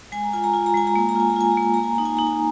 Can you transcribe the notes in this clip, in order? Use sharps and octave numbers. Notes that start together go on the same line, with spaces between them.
G#3 G#5
A#5
F4 G#5
A#5
F4 G#5
A#5
G#3 G#5
A#5
A#3 G#5
A#5
F4 G#5
A#5
F4 G#5
A#5
A#3
G#5
A#3 A#5
G#5
D#4 A#5
G#5
D#4 A#5
G#5